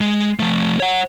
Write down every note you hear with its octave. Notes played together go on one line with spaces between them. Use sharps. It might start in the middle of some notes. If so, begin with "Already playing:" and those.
G#3
F3 A3
C#5 F#5